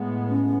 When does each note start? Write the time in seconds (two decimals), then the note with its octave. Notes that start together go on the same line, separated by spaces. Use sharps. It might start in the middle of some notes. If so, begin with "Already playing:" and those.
Already playing: A2 G#3 B3
0.29 C#4